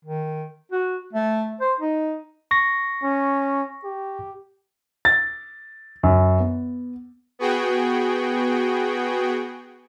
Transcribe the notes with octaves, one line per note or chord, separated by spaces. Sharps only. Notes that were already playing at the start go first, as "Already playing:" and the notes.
D#3
F#4
A3
C5
D#4
C#6 A#6
C#4
G4
A6
F#2
B3
B3 F#4 G#4 G5